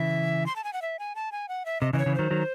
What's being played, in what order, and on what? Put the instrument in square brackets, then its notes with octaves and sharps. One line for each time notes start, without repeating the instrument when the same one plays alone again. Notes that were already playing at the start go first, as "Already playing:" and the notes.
Already playing: [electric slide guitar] C#3 E3 [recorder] E5
[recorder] C6
A5
G#5
F#5
E5
G#5
A5
G#5
F#5
E5
[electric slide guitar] C3 [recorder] D#5
[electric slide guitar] C#3 E3 [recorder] D#5
[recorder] C#5
[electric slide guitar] C#3 E3
[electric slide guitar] D#3 F#3 [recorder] C5
[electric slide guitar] D#3 F#3